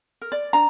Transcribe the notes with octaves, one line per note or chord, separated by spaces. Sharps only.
A#4
D5
D4 A#5